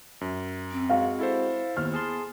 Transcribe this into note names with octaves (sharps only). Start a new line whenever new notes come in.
F#2
C4
G#3 F#4 F5
E4 A4 C5
D#2 B3 F6
G#4 A5 C6